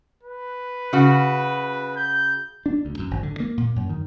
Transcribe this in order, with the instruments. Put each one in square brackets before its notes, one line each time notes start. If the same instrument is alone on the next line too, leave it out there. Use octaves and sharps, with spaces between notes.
[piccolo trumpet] B4
[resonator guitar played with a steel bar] C#3 F#4
[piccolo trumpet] G6
[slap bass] D4
D2
F#2
G#1
D3
A#3
A#2
F#2
D#3